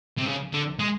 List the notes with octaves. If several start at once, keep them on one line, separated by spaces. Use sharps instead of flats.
C3
C#3
D3
G#3